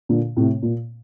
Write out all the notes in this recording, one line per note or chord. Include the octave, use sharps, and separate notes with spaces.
A#2 D3
A2 C3
A#2